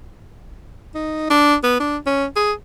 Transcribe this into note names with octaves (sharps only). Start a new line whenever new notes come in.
D#4
D4
B3
D4
C#4
G#4